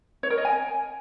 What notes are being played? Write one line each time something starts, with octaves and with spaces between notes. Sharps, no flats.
C#5
A#4
D#5
G#5